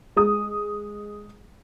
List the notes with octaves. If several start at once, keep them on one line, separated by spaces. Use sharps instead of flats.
G#3 D#6